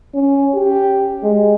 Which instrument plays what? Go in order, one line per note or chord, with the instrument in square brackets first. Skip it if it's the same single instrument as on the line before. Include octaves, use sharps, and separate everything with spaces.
[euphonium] C#4
G4
G#3